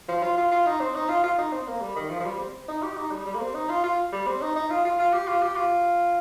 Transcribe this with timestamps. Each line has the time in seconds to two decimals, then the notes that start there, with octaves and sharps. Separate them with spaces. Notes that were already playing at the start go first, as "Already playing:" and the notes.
0.09 F3
0.23 F4
0.37 F4
0.52 F4
0.66 D#4
0.80 C4
0.95 D#4
1.09 F4
1.24 F4
1.39 D#4
1.53 C4
1.67 A#3
1.81 G3
1.96 D#3
2.10 F3
2.20 F3
2.25 G3
2.39 C4
2.68 D#4
2.83 G4
2.97 D#4
3.12 G3
3.26 G3
3.35 A#3
3.40 C4
3.55 D#4
3.69 F4
3.84 F4
4.13 G3
4.27 C4
4.42 D#4
4.56 D#4
4.70 F4
4.85 F4
4.99 F4
5.13 G4
5.28 F4
5.42 G4
5.57 F4